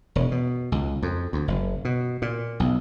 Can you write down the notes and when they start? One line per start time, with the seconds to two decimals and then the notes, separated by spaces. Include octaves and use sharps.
0.15 E1
0.31 B2
0.72 C#2
1.03 F2
1.33 D2
1.48 F#1
1.85 B2
2.22 A#2
2.60 B1